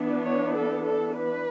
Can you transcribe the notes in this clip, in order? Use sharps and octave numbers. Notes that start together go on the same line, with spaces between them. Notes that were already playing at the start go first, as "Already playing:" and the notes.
Already playing: E3 B3 D4
C#5
A4
A4
B4